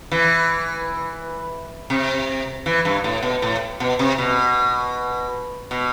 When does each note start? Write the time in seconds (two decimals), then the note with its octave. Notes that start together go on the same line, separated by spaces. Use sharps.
0.11 E3
1.90 C3
2.66 E3
2.85 G2
3.04 A2
3.22 B2
3.42 A2
3.80 B2
3.99 C3
4.18 B2
5.71 B2